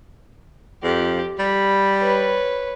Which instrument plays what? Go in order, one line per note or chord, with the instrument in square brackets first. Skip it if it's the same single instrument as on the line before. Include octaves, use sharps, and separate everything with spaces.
[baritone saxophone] F2 [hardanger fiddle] G4
[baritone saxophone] G3 [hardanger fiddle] B5
[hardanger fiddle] B4 C#5